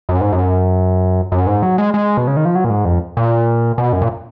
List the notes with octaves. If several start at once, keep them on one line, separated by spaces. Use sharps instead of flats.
F#2
G#2
F#2
F#2
G#2
F#3
G#3
G#3
B2
C#3
D#3
F3
F#3
A#2
G#2
F2
A#2
B2
F#2
A#2